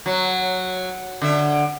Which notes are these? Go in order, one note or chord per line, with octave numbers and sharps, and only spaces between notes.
F#3
D3 E5